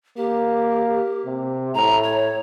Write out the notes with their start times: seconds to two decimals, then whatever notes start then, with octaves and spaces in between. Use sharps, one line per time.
0.17 A#3 G4
1.25 C3
1.75 A2 A#5
2.04 C#5